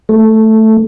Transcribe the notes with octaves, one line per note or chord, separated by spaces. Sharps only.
A3